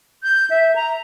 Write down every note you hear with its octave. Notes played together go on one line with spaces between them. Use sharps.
G6
E5
A#5